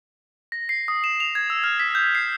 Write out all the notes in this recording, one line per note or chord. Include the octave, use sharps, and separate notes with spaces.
A#6
C7
D#6
E7
F7
G#6
E6
F6
B6
G6
C7